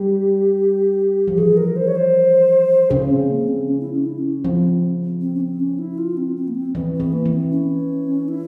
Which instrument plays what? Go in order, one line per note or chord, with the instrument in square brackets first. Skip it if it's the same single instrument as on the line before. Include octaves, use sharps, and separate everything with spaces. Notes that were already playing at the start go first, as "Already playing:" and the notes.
Already playing: [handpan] G3 [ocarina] G4
[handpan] F3
[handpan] E3 [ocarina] G#4
[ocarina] A#4
C5
C#5
C5
[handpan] C#3 [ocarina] C#4
[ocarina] C4
A#3
C4
C#4
E4
C#4
E4
C#4
[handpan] F3 [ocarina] C4
[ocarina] C4
C#4
C4
C#4
E4
F4
C4
C4
A#3
C4
[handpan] E3 [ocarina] C4
[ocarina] C4
[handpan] E3
[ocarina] A#3
[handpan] E3
[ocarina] C4
C#4
E4